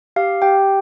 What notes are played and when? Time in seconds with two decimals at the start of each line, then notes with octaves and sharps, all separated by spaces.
0.16 G4 F5
0.42 G4 G5